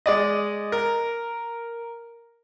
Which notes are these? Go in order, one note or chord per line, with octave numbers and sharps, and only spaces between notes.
G#3 D5 D#5
A#4